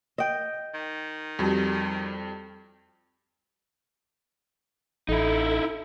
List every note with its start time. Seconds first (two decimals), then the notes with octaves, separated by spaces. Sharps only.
0.18 D#5 G5
0.74 D#3
1.39 F2 G3 C4 F#4 G4
5.09 A1 D#4 E4 A4